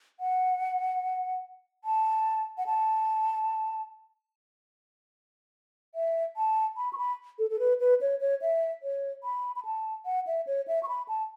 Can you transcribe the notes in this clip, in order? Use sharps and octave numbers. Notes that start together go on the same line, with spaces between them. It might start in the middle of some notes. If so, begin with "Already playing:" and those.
F#5
A5
F#5
A5
E5
A5
B5
C#6
B5
A4
A4
B4
B4
C#5
C#5
E5
C#5
B5
B5
A5
F#5
E5
C#5
E5
C#6
B5
A5